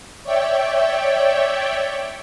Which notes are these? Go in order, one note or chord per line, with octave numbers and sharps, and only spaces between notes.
C#5 D5 E5 G5